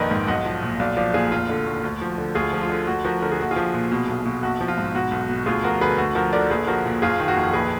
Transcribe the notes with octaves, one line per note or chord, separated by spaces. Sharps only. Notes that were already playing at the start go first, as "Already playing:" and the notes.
Already playing: A#1 F2 D#3 A#4 B4 D5 D#5
G#2
B1 D#5 F#5
F3
A#2
B1 D5 F5
F3 D5 F5
A#2 F4 G#4
F1 F4
D3
D#2
D2
F3
D3
D2 F4 G#4
F3
F4
D3
D2 F#4
F3 F#4 A#4
D3 A#4
G#4
A#1 F#4
F4 G#4
F3
A#2
B2
B1
B2
A#1 F#4
F3
F4
G#2
B2 F#4
B1
B2
D2 F4 G#4
F3 F#4 A#4
D3 G#4 B4
D2 F#4
F3 F#4 A#4
D3 A#4 D5
A#1 G#4 B4
F3 F#4 A#4
A#2
F#1 F4 G#4
D#3
F#4 A#4
F2
A#1 G#4 B4